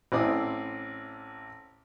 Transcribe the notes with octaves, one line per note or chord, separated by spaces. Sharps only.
A1 C4 E4 D5 D#6